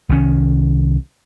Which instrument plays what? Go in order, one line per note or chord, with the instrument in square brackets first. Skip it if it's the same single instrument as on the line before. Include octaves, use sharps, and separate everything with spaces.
[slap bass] C2 D#3 C#4